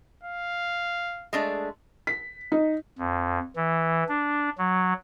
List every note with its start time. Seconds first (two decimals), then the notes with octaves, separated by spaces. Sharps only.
0.23 F5
1.33 G#3 A3 D4
2.07 B6
2.52 D#4
2.98 F2
3.56 E3
4.08 D4
4.58 F#3